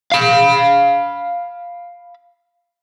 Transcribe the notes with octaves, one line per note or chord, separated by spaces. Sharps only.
F5 B5